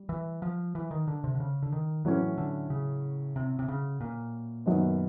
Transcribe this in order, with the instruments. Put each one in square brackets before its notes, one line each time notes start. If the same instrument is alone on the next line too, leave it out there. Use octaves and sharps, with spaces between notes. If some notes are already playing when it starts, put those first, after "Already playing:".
Already playing: [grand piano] G3
[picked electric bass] E3
F3
E3
D#3
D3
C3
D3
C#3
D3
D#3
[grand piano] A2 F#3 A3 C#4 [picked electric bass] E3
[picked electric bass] D3
C#3
C3
C3
C#3
A#2
[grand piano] F#2 D#3 F#3 B3 D#4